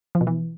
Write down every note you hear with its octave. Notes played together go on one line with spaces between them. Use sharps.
F3
B2
E3